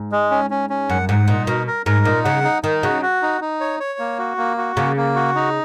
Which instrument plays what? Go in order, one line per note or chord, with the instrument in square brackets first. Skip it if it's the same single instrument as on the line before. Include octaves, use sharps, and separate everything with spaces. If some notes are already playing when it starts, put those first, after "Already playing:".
Already playing: [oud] G#2
[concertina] G#3
C#4
C#4
C#4
[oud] F#2 [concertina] F#5
[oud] G#2 [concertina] F#5
[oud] A#2 [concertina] D#4
[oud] B2 [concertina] A#4
[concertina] A#4
[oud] G#2 [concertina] A#4
[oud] A#2 [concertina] D#4
[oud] C#3 [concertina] F#5
[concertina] D#4
[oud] D#3 [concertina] D#4
[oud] C#3 [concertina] F#4
[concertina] F#4
D#4
D#4
C#5
C#5
A#3
F#4
A#3
F#4
[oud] C#3 [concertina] A#3
[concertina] A#3
F#4
D#4